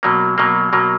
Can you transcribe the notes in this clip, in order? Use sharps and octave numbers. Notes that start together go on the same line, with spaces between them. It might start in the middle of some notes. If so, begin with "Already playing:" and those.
B2 F#3 A#3
B2 F#3 A#3
B2 F#3 A#3